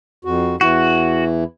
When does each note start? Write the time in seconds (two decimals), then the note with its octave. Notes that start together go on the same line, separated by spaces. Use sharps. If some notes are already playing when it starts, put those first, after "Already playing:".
0.25 F2 F#4
0.61 E2 E3 E4 F#4